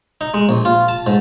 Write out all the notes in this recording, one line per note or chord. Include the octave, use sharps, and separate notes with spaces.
D#4
G#3
A#1
F4
A5
G#2